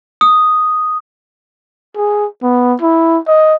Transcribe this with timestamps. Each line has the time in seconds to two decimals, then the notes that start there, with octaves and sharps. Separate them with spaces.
0.21 D#6
1.97 G#4
2.42 B3
2.82 E4
3.28 D#5